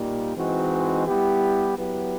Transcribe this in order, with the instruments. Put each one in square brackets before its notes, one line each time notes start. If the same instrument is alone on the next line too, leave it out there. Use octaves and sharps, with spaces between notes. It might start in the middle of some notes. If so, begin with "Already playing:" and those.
Already playing: [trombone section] A#2 G3 A#3 D#4 G4
E3 G#3 C4 D#4 F#4
G3 B3 E4 G4
F#3 B3 E4 G4 B4